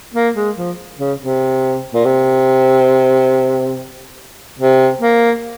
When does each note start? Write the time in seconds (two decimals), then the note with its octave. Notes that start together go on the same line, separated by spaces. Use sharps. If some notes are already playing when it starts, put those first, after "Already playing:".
0.14 A#3
0.35 G#3
0.56 F3
0.98 C#3
1.20 C3
1.94 A#2
2.05 C3
4.59 C3
5.01 A#3